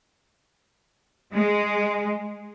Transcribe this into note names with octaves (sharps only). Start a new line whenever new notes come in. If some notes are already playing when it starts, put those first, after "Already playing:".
G#3